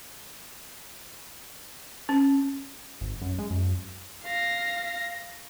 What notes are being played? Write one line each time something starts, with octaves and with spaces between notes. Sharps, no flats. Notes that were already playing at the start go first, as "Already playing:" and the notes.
C#4
G#1
F#2
G#3
F#2
F5 A#6